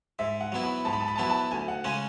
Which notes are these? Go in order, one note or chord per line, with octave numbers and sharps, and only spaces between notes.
G#2 E5
F#5
F#3 B3 E4
B5
G#2 A5
B5
A5
B5
A5
F#3 B3 E4 B5
A5
D2 G#5
F#5
C#3 G#3 C#4 G#5